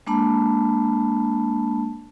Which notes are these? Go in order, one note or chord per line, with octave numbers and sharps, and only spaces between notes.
G#3 A#3 D4 A5 B5